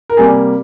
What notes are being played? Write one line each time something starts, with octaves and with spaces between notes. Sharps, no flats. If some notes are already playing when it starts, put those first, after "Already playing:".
A#4
C3 G3 A#3 G#4